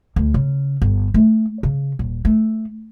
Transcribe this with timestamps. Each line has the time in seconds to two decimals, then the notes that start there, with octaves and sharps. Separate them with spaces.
0.16 D2
0.34 C#3
0.82 G1
1.14 A3
1.63 C#3
1.99 D#1
2.25 A3